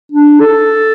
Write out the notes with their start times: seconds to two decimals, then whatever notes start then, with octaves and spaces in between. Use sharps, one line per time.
0.12 D4
0.40 A4